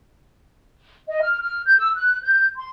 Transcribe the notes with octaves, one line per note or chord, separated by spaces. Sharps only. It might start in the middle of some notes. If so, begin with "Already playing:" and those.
D#5
F6
F6
G6
E6
F#6
G6
C6